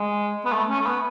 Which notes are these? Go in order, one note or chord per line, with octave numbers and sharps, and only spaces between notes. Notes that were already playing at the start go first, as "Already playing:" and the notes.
Already playing: G#3
B3
A3
C#4
A3
B3